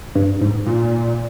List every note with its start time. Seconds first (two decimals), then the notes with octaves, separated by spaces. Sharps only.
0.15 G2
0.41 G#2
0.66 A#2